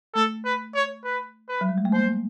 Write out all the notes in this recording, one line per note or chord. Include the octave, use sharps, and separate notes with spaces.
A3 A4
B4
C#5
B4
B4
F#3
G3
G#3
A3
A#3 C5